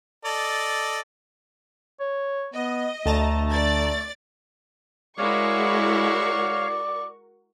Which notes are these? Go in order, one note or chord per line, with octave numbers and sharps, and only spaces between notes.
A4 D5 D#5
C#5
B3 D#5
D2 A3 A5 A#5
D5 A6
G#3 E4 F#4 A#4 C#5 D5 F5 C#6